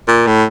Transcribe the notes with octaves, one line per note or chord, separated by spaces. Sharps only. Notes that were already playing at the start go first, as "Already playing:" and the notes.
A#2
A2